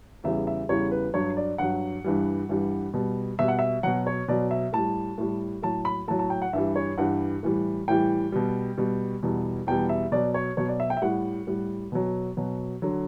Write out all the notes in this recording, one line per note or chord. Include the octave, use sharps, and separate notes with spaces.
E2 C#3 E3 G3 E5
E5
E2 C#3 E3 G3 C#5
B4
G2 F#3 C#5
D5
G2 F#3 F#5
G2 E3 G3
G2 E3 G3
B2 G3
B2 G3 E5
F#5
E5
B2 F#3 F#5
C#5
B2 F#3 D5
E5
A2 G3 A5
A2 G3
A2 F#3 A5
B5
A2 F#3 A5
A5
G5
F#5
G2 E3 G3 E5
C#5
G2 E3 G3 F#5
A2 E3 G3
A2 E3 G3 G5
B2 G3
B2 G3
E2 B2 G3
E2 B2 G3 G5
E5
B2 F#3 D5
C#5
B2 F#3 C#5
D5
E5
G5
E5
A2 G3 F#5
A2 G3
B2 F#3
B2 F#3
D3 F#3